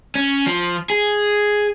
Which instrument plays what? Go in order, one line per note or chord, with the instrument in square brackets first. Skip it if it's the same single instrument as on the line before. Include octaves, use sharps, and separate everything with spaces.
[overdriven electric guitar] C#4
F3
G#4